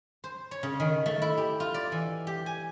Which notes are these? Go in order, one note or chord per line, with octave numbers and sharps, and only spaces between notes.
C5
C#5
C#3
D#3
A3
E4
G4
F4
D5
E3
G4
G#5